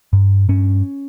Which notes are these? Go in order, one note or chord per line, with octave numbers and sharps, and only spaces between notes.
G2
G2 C#4